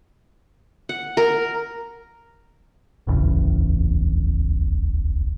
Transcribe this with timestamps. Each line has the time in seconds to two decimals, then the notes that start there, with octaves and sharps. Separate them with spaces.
0.89 F#5
1.17 A#4
3.07 D1 A1 E2 C#3